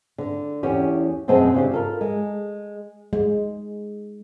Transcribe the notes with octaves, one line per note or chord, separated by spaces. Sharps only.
D3
E2 C#4 G4
F#2 B2 C4 G#4 D#5 A5
C#3 D4 G4
F4 A4 A#4
G#3
G#3